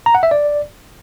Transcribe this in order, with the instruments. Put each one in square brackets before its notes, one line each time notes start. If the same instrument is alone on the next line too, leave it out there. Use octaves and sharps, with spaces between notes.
[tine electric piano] A#5
F#5
E5
D5